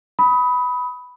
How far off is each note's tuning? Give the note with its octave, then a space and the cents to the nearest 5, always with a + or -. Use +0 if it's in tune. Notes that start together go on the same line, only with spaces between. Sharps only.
B5 +0 D#6 +25